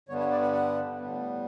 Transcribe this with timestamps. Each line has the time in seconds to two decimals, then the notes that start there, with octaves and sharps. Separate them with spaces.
0.09 G2 D3 G3 B3 C#5
0.20 C#5
0.31 D5
0.42 F#5
0.53 F#5
0.97 A2 G3 B3